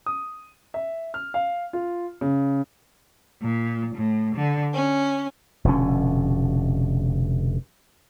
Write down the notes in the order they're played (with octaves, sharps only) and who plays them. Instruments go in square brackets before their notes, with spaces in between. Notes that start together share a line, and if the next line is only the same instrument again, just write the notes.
[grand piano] D#6
E5
F6
F5
F4
C#3
[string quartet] A#2
A2
D3
C#4
[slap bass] F1 B2 D3 C#4